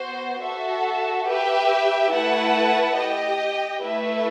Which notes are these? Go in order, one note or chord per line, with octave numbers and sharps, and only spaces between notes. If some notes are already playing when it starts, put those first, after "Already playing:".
Already playing: B3 F#4 C5
F#4 A4 E5
G4 B4 E5 G5
A3 E4 B4 F#5 A5
G4 D#5 G5
A3 E4 B4 E5